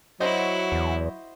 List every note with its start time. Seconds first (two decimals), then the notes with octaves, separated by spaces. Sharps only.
0.20 F#3 E4 F#4 C5 D#5
0.72 E2